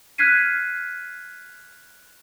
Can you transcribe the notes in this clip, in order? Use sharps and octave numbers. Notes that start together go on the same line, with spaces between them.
F6 F#6 G#6 B6 C7 D#7